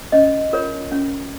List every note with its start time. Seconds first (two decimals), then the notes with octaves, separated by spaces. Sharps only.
0.12 C#4 D#5
0.53 F4 A#4 C#5
0.92 C#4